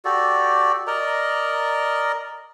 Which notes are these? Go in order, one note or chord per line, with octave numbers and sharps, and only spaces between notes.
F#4 G4 A4 D5
A#4 D5 D#5 A#5